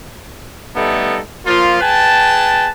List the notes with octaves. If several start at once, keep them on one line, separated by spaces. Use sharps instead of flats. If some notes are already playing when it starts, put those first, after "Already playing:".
G3 A3 B3 D#4 A4
A#2 F3 F4
G#4 B4 G5 A5